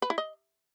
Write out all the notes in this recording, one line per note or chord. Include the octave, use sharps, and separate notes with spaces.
B4
E4
D#5